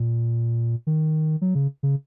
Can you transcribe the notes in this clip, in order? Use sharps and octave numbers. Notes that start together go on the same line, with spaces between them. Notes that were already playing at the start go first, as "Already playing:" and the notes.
Already playing: A#2
D#3
F#3
C#3
C#3